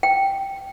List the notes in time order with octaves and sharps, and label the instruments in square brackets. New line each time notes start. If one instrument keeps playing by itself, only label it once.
[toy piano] G5